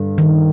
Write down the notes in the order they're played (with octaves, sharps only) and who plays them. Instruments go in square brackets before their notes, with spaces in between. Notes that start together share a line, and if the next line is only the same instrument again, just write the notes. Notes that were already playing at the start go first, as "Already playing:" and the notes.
Already playing: [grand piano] G2 D3
[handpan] D#3